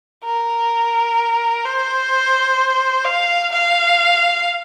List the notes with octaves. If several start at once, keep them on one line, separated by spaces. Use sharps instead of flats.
A#4
C5
F5
F5